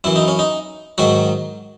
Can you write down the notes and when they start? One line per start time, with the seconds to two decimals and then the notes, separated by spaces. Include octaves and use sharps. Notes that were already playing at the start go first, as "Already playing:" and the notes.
0.04 F#2 E3 E4
0.16 D#4
0.28 C#4
0.39 D#4
0.98 G#2 D#3 F#3 F#4